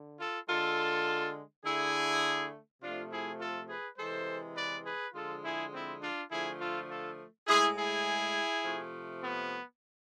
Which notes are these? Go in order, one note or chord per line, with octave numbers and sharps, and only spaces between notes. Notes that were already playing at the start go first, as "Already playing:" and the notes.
Already playing: D3
F4 A4
D3 G#3 F4 A4
D3 A3 E4 G#4
C3 F3 A3 D4 F4
E4 G#4
F4 A4
G#4 B4
C3 E3 G#3 A4 C5
B4 D5
G#4 B4
D3 F3 G#3 F4 A4
E4 G#4
C4 E4
D4 F4
D3 F3 A3 E4 G#4
F4 A4
F4 A4
A2 G#3 E4 G#4
E4 G#4
C3 F3 A3
B3